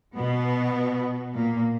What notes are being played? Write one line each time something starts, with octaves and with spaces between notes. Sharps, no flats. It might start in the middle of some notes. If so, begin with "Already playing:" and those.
B2 B3
A#2 A#3